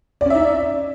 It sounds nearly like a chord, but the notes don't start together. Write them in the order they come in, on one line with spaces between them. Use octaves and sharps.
D5 C#4 E5 D#4